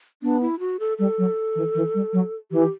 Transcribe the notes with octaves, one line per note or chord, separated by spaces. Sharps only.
B3 D4
E4
F#4
A4
G3 A4
F#3
E3
E3
G3
F#3
E3 G4